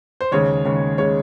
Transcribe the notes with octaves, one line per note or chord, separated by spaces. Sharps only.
C5
D#2 C#3 G#3 C#5
D#2 C#3 G#3
C#3 G#3 C#5